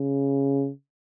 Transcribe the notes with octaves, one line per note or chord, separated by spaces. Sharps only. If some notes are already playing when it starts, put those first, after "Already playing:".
Already playing: C#3